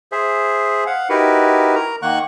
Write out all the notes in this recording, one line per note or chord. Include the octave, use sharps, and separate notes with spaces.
G#4 C5 E5
F5 F#5
D#4 E4 F#4 G4 A#4 B4
A#4 A#5
D#3 A#3 F#5 C#6 F#6